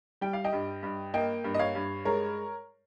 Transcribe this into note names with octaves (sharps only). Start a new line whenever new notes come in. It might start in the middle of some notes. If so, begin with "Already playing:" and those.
G3 G5
F5
D#5 G5
G2
G2
A#3 D#5 G5
G2
D#5
C#5 F5
G2
G#3 A#4 C#5